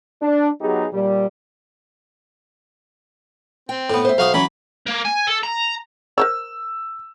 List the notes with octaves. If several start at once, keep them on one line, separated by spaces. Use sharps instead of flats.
D4
F#3 B3 D#4 G4 G#4
A#2 G3
C4 G5
A2 B3
C5 E5
B1 F#4 F5 D#6
E3 F#3 C#4 B5
A#3
G#5
A4
A#5
A#4 C5 C#5 E6